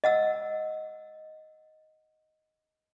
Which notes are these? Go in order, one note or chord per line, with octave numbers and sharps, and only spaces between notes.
D#5 F#5 E6